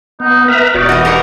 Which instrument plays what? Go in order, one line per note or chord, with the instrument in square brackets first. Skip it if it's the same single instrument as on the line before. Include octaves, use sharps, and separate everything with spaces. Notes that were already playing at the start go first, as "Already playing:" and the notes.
[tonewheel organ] B3 [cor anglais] D#4
[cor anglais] A#4 [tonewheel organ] B4 E5 A#5
[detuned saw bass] E1 [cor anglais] D#4 [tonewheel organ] F#4 D5
[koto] E3 F#4 [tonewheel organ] D#5
[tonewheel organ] G4 A#5 [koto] A#4 C5 C#5